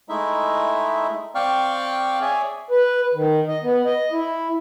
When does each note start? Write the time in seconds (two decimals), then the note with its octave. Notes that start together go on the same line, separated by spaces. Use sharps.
0.09 G#3 A3 D#4 E4 E5
1.35 C4 D5 F5 G5 C#6 F6
2.21 G#4 C#5 D5 E5 G#5
2.71 B4
3.14 D#3
3.47 D#5
3.63 B3
3.85 D#5
4.12 E4